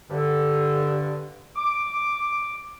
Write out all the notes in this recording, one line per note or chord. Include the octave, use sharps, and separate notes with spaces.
G2 D3
D6